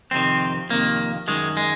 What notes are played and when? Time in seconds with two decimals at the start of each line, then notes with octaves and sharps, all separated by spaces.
0.11 F2 C3 D#3 C4
0.69 F2 C3 D#3 A#3
1.27 F#2 D#3 G#3
1.57 G#3